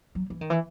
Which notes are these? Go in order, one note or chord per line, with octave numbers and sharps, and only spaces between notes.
F#3
E3
D#3
E3